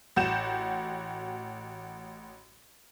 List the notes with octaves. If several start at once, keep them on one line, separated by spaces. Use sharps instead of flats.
A1 F#4 G6 E7